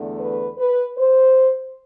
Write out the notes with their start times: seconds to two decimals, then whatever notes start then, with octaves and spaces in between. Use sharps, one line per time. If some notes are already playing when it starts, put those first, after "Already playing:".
Already playing: E2 D3 A3
0.20 B4
0.58 B4
0.96 C5